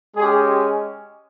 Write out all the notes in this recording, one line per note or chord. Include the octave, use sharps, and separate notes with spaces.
G#3 C#4 G4 G#4